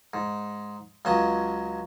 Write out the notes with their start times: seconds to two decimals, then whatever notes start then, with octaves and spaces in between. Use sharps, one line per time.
0.14 G#2
1.05 C#2 F#3 D#5 A5